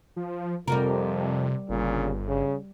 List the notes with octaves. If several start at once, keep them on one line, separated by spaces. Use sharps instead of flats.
F3
F2 C3 G3 F#4 A#4
G1 A#2 C#3
C#3